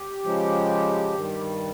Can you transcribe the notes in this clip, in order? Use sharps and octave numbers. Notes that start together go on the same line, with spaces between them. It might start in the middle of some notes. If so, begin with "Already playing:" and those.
Already playing: G4
C#3 F3 G#3
G2 D#3 G3